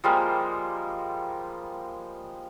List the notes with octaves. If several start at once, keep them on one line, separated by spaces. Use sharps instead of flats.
F3 G3 G#3 A#3